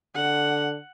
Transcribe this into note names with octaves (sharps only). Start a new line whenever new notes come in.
D3 F#5